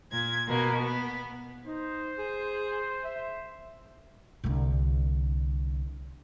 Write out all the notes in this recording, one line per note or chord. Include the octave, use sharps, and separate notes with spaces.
A#2 G#6
B2 A#3
B3
D#4 C5
G#4
E5
C2 D3